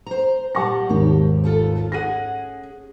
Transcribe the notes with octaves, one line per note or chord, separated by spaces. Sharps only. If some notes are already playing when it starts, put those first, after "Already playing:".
C5 A#5
A#2 G3 F#5 A5 C#6 A#6
G#1 D#2 G#2 G3 G4
A3 F4 A4
C#4 G#4 F#5 A#6 D#7